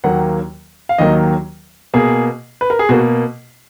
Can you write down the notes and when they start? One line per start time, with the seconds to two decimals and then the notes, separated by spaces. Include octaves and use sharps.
0.04 D#2 D#3 F#3 A#3 F#5
0.89 F5
0.98 D#2 D#3 F#3 A#3 D#5
1.94 B2 A#3 G#4
2.61 B4
2.70 A#4
2.79 G#4
2.89 B2 A#3 F#4